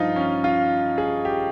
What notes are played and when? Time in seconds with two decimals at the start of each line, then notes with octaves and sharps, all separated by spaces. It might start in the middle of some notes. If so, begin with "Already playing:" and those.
Already playing: G2 F3 D#4 F4
0.16 C#4
0.44 F4
0.98 G#4
1.25 G4